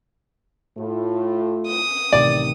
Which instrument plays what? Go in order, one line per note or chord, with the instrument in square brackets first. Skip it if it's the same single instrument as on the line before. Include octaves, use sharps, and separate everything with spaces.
[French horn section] A2 A3 F4
[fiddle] D#6
[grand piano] A1 C3 D#3 [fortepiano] D5